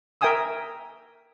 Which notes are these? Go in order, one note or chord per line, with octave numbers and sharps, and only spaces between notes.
A#4 E5 G5 G#5 D#6 E6